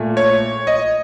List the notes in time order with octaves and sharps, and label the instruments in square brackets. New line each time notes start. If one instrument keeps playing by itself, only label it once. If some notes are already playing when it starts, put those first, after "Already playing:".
Already playing: [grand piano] A#2 A3
C#5
D#5